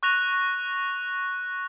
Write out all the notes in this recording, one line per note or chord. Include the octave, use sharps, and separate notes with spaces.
C#6 F#6 A#6 F7